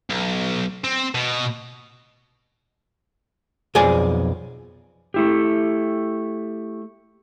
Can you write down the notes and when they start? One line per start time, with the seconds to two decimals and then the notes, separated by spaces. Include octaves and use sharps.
0.10 B1
0.84 C4
1.15 B2
3.75 B1 F2 G#4 D5 G#5
5.14 A3 E4 G4